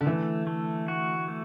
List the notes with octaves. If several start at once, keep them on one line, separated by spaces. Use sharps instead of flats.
D3
E3 A3
A3
F#4
A3